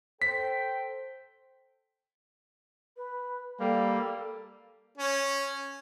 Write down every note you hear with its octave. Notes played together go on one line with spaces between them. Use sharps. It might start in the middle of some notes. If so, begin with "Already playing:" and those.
A4 C5 G5 B6
B4
G3 A#3 A4
C#4